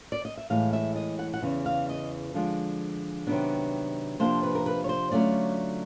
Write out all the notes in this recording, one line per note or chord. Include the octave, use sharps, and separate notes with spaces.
D5
D#5
E5
A2 E3 G#3 F5
E5
D#5
F#5
F#5
E2 C#3 E3
F5
D#5
D3 F3 G#3
C3 D#3 F#3 B3 D4
C3 F3 A#3 D4 C5
B4
A#4
B4
C#5
C5
D3 F#3 A3 C#4 F4 D5